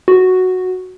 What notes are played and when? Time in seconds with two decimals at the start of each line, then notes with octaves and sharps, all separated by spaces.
0.08 F#4